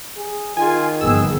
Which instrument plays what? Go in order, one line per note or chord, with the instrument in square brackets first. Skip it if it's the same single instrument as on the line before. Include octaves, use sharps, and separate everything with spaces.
[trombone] G#4
[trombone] D#3 [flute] F4 [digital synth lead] G#5
[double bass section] G1 F2 B3 [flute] G#4 [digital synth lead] E6